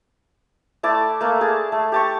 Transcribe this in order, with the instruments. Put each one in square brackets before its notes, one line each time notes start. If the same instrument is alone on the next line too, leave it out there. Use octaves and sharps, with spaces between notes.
[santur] A3 E4 D5 A5
A3 A#3
G#4 A5
A3
G4 A5 C#6